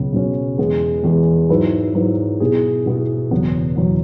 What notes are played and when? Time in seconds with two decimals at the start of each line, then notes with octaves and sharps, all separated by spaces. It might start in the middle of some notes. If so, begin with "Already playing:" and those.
Already playing: C#2 B2 F#3 C#4
0.13 C#2 B2 F#3 C#4
0.58 E2 E3 G#3 B3
1.04 E2 E3 G#3 B3
1.49 G#2 F#3 E4 B4
1.95 G#2 F#3 E4 B4
2.40 B2 B3 E4 G#4
2.86 B2 B3 E4 G#4
3.31 F#1 E2 B2 F#3 B3
3.76 E2 B2 F#3 B3